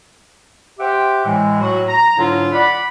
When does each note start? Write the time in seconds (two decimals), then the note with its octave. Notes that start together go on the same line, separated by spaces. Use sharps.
0.79 G4 C5 E5 F#5 G5
1.26 A2 E3 G#3
1.60 A2 F#3 A3 F#4
1.88 A#5
2.17 G#2 D3 F#3 D4 E4 F4
2.53 D5 F#5 B5